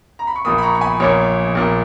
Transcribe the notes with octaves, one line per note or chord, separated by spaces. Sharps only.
A#5
B5
C#6
A#1 A#2 A#3 B5 D#6
B5
A#5 C#6
C#6
G#5 B5
A#1 A#2 A#3 C#5
A#1 A#2 A#3